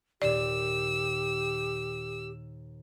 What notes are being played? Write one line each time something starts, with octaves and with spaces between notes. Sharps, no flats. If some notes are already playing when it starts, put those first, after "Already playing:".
D#2 A#2 G4 D5 E6